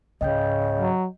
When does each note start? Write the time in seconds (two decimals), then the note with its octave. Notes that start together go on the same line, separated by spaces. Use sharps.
0.21 C#2 G#2 C#3 D#5 G5 G6
0.79 F#3